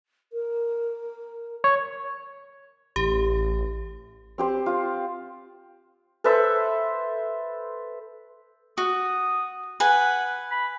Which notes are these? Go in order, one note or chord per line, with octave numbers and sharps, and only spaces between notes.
A#4
C#5
A1 G4
C4 G4 C5
F4
A4 B4 C5 E5
F#4 D#6
B4 F#5 G#5
B5